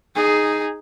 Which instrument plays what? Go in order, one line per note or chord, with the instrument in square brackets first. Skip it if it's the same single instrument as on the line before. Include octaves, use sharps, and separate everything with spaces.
[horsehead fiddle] D#4 G#4